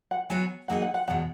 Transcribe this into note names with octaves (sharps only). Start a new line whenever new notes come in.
F#5
F#3 B3 F#4 C#5 G#5
F#3 A#3 D#4 G#4 D#5 F#5
F#5
F#5
E2 B2 G#3 F#5